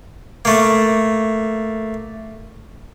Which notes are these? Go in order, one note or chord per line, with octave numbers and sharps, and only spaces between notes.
A3 A#3